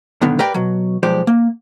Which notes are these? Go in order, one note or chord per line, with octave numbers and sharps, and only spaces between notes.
B1 G2 D3 D#3 B3
G4 A#4 B4 D5 G5
B2 F#3
B1 F3 G#3 G4 C5 D5
A#3